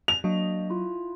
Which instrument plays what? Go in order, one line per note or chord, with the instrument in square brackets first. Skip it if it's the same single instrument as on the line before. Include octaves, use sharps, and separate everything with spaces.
[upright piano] F7
[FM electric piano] F#3 [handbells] A#3 D4 D#5
[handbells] E4 F4